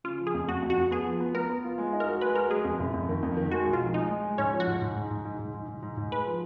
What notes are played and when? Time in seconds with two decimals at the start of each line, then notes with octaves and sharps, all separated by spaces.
0.04 C#3 F4
0.20 F3
0.27 G#4
0.34 F2
0.48 F2 F#4
0.62 F2
0.70 F#4
0.77 F2
0.91 B3 G#4
1.06 F3
1.20 B3
1.34 B3 A#4
1.50 B3
1.64 F4
1.78 G#3
1.93 D#4
2.00 A#4
2.07 F#4
2.21 G#3 B4
2.35 F#4 A#4
2.50 G#3 G#4
2.65 F2
2.79 F#1
2.94 F2
3.09 D#3
3.23 F2
3.37 D#3
3.52 G#3 F#4
3.66 B1
3.73 F4
3.80 F3
3.94 G#3 D#4
4.09 G#3
4.24 G#3
4.38 G#2 C#4
4.53 F3
4.60 F#4
4.67 G#2
4.81 G#2
4.96 G#2
5.11 G#2
5.25 G#2
5.39 G#2
5.54 G#2
5.68 G#2
5.82 G#2
5.97 G#2
6.12 G#3 B4
6.26 F3